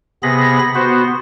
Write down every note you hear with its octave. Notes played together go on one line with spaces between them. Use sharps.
C3 B3 G#4 B5 A#6
B3 F#4 C5